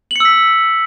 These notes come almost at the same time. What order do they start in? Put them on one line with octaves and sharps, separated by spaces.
F#7 C#7 E6 B6